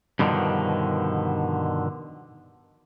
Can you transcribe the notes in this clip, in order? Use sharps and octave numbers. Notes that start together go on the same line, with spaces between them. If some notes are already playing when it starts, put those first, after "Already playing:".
G2 B2 D3 D#3 F3